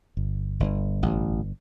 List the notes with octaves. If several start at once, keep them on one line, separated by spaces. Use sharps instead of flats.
G1
G1
A1